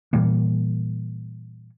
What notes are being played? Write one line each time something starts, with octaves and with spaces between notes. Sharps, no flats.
A#2 E3 G3 A#3